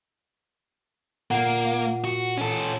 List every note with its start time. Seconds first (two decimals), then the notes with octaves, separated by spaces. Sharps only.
1.31 A#2 A#3 F#5
2.04 F#4
2.37 C#4 A4